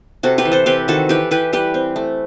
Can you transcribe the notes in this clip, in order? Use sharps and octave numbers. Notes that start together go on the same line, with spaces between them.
C3 F#4 A4
G4 B4
E3
A4 C5
C4 G4 B4
D#3 F#4 A4
E3 G4 B4
E3 G4 B4
G3 G4 B4
C4
A3